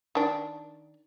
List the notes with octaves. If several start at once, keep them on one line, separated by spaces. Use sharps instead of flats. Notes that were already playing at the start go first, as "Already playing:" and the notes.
D#3 D4